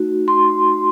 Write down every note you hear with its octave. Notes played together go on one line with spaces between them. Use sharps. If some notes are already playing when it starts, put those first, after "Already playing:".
Already playing: A3 D#4 F#4
C6